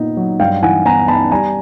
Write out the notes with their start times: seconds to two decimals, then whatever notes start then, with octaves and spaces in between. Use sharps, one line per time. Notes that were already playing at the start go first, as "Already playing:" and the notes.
Already playing: A#2 B3 D#4
0.17 F#3
0.40 G2 F5 G5
0.63 E3 F#5 G#5
0.86 B3 G#5 A#5
1.08 B3 A5 B5
1.31 G3 G#5 A#5